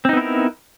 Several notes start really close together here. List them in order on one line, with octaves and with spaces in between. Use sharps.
C4 D#4 B3 E4 A#4